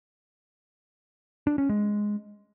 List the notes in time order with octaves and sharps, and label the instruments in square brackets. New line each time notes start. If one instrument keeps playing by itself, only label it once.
[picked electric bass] D4
C#4
G#3